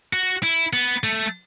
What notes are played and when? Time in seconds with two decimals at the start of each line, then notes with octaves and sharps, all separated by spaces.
0.13 F#4
0.43 E4
0.73 B3
1.04 A3